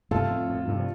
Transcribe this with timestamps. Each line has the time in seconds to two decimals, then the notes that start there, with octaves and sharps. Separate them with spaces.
0.11 G2 C3 A3 F4 A4
0.30 F2 A2
0.50 F2 A2
0.68 G2 C3
0.80 F3